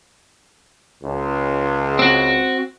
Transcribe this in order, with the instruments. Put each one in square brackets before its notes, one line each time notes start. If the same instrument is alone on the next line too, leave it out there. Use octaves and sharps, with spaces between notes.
[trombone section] C#2
[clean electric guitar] C4 F#4